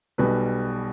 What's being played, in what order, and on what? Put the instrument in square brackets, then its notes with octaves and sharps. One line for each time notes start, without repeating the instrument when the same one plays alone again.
[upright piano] B1 B2 G3 B4